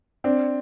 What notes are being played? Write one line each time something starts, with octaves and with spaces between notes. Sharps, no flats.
C4 D4